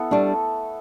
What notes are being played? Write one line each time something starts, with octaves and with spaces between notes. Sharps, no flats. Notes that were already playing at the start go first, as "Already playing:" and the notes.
Already playing: B3 E4 A4
G3 A3 D4